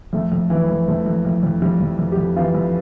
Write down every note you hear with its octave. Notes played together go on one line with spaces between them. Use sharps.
F2 A3
F2
E3
F2
F2 A3
F2
F2
F2
F2 G3
F2
F2
G4
F2
E3 F4
F2